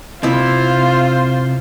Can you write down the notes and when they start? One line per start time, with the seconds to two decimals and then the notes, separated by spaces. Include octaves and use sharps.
0.23 C3 E4 F4 C5 E5